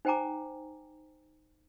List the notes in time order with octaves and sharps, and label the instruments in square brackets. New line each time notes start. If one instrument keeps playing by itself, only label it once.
[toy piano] D#4 C5 G5 G#5 A#5 D6